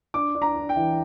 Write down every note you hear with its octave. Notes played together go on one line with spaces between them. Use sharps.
D4 D6
D4
A#5
D4
G5
E3